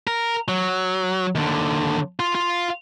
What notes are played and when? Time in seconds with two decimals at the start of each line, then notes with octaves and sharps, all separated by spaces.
0.07 A#4
0.48 F#3
1.35 D#2 D3
2.20 F4
2.35 F4